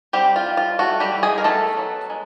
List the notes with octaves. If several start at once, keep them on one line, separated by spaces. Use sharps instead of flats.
G3 C4 G4
F4
G3
F4
A3 F#4
G3 G4
E3
G#3 G#4
A#4
A3 B3 A4
F#3
G#3